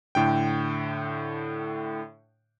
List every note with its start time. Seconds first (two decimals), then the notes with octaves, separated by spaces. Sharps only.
0.15 A2 D3 G5